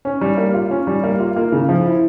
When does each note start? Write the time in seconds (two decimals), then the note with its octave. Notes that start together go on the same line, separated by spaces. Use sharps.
0.05 C#4
0.21 G3
0.37 A#3
0.54 F4
0.71 C#4
0.87 G3
1.03 A#3
1.20 F4
1.36 A#3
1.52 C#3
1.69 F3
1.86 E4